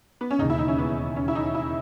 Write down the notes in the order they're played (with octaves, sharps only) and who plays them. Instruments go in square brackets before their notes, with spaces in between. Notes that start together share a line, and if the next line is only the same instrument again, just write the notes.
[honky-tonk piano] B3
C#4
[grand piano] E1 D#2 C#3 [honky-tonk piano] D#4
[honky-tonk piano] E4
D#4
C#4
B3
C#4
E4
D#4
E4